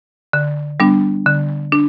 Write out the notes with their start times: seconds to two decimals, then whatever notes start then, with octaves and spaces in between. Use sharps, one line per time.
0.33 D3
0.80 G3 B3 D4
1.26 D3
1.72 D4